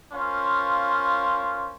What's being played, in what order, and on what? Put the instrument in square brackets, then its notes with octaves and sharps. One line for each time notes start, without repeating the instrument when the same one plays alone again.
[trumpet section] C#4 F4 A#4 C5 F5